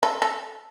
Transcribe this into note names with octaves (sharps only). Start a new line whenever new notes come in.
A4
A4